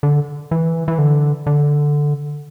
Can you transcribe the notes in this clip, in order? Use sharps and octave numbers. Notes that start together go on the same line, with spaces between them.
D3
E3
E3
D3
D3